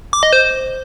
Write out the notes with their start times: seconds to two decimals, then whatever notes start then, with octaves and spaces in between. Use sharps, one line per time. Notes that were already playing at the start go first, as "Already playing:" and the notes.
0.13 D6
0.23 D#5
0.33 C5